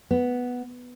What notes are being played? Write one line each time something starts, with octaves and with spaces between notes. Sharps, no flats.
B3